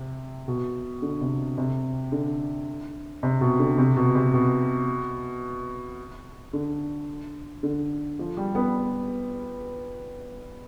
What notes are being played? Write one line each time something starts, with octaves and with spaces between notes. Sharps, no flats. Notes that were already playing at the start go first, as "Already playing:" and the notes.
Already playing: C3
B2
D3
C3
C3
D3
C3
B2
D3
C3
B2
C3
B2
D3
D3
F3
G3
B3